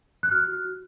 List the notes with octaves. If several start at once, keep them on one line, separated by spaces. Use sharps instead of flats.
F#6
F#4 F6
F#4
F#4